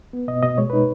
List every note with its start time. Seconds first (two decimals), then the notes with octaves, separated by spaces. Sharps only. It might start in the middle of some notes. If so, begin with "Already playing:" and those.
0.13 B3
0.28 B2 D#5
0.43 B2 D#5
0.58 G#3 C#5
0.70 D#4 B4